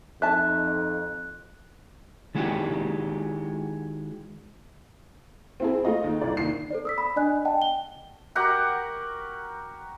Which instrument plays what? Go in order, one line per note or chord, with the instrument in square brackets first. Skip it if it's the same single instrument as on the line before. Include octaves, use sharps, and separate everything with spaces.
[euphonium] F2 [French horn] D#4 [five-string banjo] E5 A5 [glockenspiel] F#6
[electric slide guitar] D#3 G#3 E4 F#4 G4
[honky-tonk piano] C4 E4 G#4
A3 F4 D#5
D#2
C2 D5
D#2 D#3 C7
[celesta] A4 C5 D5
D#6 E6 B6
B5
D4 D5 D#5 G#5 F#6
D#5 F#5 G5 A5
G5 G7
[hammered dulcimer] F#4 G4 A#4 F#5